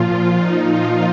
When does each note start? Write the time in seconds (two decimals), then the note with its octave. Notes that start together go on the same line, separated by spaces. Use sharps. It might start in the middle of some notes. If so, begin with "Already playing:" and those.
Already playing: A#2 F3 F4
0.39 A#2 F3 D#4
0.71 F4